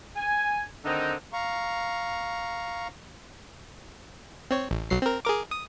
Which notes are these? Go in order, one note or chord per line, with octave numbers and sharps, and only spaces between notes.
G#5
D3 D#3 C4 D#4
F5 A#5 C#6
C4 C#5
A1
B1 F#3 C7
C4 A#4
G#4 A#4 D6
D#6